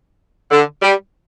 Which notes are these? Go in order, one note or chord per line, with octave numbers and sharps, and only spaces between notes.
D3
G3